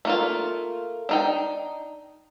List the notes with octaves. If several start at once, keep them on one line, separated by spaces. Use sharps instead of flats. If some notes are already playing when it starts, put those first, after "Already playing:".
A3 A#3 F4
D4 D#4 G5